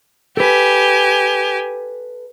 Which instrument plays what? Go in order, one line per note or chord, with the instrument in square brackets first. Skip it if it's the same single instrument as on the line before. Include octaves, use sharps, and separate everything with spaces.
[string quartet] G4 G#5 [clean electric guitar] A4 B4